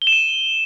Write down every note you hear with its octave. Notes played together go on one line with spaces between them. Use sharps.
G7
E7
D#7